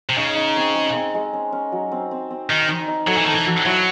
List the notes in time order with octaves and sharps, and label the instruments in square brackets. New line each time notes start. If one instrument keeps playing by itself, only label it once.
[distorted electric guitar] C3
[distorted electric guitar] C#3 [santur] D#4
[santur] D#4
C4
G#3
C4
G#3
C#4
C#4
F#3
C4
C4
C4
[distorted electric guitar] D#3 [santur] D#4
[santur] D#4
D#4
[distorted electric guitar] F#3 [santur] A4
[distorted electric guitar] E3
[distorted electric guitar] D#3 [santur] A4
[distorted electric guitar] E3
[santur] F#4
[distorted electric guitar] F#3 [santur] E4